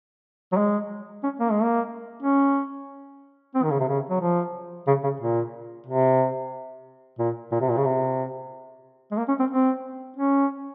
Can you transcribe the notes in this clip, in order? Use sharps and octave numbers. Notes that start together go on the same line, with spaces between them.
F#3
G#3
C#4
A#3
G#3
A#3
C#4
C4
D#3
C#3
C3
C#3
F#3
F3
C#3
C#3
A#2
C3
A#2
A#2
C3
A#2
C#3
C3
G#3
A#3
C#4
C4
C4
C#4